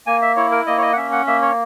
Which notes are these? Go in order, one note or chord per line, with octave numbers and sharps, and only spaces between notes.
A#3 G#5
E5
E4 C#5
A#4
A#3 D#5
C#5
D#5
F#5
C#4 E5
F#5
A#3 E5
C#5